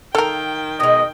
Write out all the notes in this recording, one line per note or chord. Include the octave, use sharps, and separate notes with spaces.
D#3 A4 A#4 F5 G5
B2 G#3 D#5